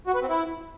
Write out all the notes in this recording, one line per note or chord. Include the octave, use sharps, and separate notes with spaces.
F#4
B4
C4
E4